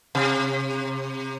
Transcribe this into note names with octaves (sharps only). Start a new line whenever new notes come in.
C3